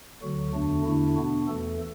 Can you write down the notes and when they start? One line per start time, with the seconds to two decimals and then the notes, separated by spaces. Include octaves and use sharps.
0.22 D2 D3 F#3 F#4
0.53 E2 D3 A3 D4
0.85 E2 D3 A3 D4 E4
1.16 B2 B3 D4 F#4
1.47 E2 E3 A3 A4